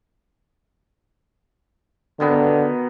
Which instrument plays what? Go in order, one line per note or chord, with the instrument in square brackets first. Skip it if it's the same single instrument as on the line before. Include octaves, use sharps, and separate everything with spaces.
[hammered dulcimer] B2 D#3 B3 [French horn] D3